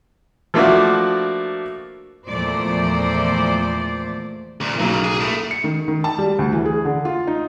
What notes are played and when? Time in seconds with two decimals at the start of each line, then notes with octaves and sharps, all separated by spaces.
0.54 F3 A3 A#3 D4 E4 F#4
2.29 E2 A#2 F3 A3 C5 D5
4.61 D2 A#2
4.79 B1 C#3 F#3 A#3
5.04 G#4
5.20 A2 A3
5.51 C#7
5.64 D#3
5.88 D#3
6.04 A5
6.19 G3
6.39 D2
6.52 E3
6.66 G#4
6.85 D3
7.05 F4
7.27 D#4